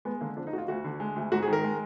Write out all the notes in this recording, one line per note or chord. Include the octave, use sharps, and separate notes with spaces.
G#3 B3
D3 A#3
F3 D4
D#4
D2 F#4
F4
D2 F#4
D3
G#3
D2
G#2 F#4
G#4
D#3
A#4
G#3